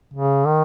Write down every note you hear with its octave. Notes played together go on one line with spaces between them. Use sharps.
C#3
D#3